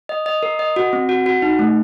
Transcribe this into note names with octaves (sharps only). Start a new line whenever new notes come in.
D#5
D#5
A#4
D#5
F#4
C4
F#4
F#4
D#4
A3